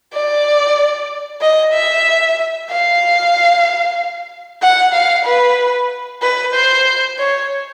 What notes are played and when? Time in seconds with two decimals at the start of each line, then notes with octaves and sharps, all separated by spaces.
0.14 D5
1.41 D#5
1.73 E5
2.70 F5
4.62 F#5
4.94 F5
5.25 B4
6.22 B4
6.54 C5
7.18 C#5